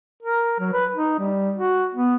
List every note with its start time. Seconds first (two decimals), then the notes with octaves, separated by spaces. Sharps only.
0.23 A#4
0.60 F#3
0.73 B4
0.95 D#4
1.19 G3
1.56 F#4
1.94 B3